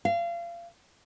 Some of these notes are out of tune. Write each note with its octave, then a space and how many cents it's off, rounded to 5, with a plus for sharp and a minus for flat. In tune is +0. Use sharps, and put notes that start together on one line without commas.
F5 -30